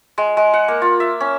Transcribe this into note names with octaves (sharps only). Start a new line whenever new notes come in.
G#3
G#3
F#5
A#3
F4
E5
C#4